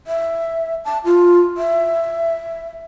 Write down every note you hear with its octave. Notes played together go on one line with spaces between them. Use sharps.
E5
A5
F4
E5